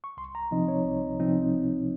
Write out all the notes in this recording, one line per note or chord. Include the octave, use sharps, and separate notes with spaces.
C#6
C2 C6
A#5
C3 F3 C4 D#4 D#5
C#5
C2
C3 F3 C4 D#4